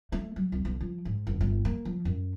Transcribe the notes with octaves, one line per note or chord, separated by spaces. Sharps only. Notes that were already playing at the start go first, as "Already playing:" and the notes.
A3
F#3
C2
B1
F3
G#2
F#1
G1
A#3
F3
F#2